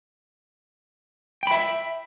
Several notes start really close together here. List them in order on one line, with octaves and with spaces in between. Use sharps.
G5 B5 E5